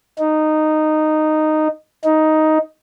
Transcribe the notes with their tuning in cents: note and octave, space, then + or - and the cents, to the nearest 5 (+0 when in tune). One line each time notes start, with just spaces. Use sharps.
D#4 -10
D#4 +5